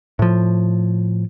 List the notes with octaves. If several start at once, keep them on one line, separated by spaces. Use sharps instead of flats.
A2 F3